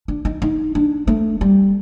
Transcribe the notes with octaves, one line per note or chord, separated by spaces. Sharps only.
D4
D#4
D#4
D4
A3
G3